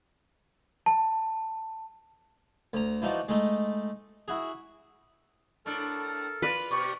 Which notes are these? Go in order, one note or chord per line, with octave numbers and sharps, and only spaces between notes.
A5
D2 A#5
E3 F3 D#4 F#4 D5
G#3 A3 D#4
E4 F#4 G#4
A2 D4 A4 A#4 A5
F4 B4 D5
B2 G4 D5 C#6